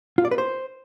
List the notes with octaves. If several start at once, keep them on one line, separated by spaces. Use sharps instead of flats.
F4
D5
B4
C5